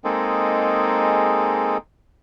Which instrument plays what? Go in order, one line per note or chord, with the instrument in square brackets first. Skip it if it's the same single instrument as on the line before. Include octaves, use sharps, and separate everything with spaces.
[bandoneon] G#3 A#3 C4 D#4 G#4 A4